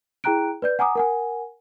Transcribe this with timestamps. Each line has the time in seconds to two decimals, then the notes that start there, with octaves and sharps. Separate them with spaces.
0.24 E4 G#4 G5 A#5 F#6 D7
0.62 B4 D5 G6
0.79 F#5 G#5 A#5 D6 D#6
0.95 A#4 F#5 G#5